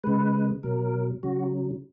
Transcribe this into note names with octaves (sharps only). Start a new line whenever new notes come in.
C#3 G#3 B4
B2 F#3 A#4
C#3 F#3 F#4